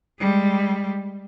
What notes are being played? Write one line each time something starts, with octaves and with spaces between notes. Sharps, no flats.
G3 G#3